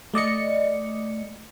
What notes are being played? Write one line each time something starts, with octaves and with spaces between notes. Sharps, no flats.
A3 D5 D#5 C#7